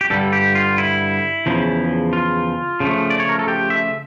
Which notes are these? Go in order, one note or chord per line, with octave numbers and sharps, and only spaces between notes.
G4
G2 D3 G3 A4
G4
F4
E4
E2 C#3 F3
F4
C#3 F3 A3
D5
C#5
A#4
A4
G4
E5